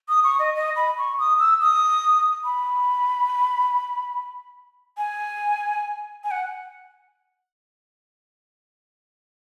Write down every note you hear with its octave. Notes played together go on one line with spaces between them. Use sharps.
D#6
C#6
D#5
D#5
B5
C#6
D#6
E6
D#6
B5
G#5
G#5
F#5